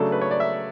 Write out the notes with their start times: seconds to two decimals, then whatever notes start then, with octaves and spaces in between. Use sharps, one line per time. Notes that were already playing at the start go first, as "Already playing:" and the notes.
Already playing: C#3 F#3 A3 D4 A4
0.12 B4
0.21 C#5
0.31 D5
0.40 E5